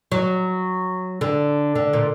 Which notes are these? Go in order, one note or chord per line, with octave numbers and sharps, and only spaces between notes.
F#3
D3
D3
A#2